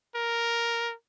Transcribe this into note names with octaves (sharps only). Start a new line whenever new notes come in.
A#4